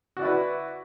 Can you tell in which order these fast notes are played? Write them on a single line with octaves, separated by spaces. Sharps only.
F#4 D5 E4 B4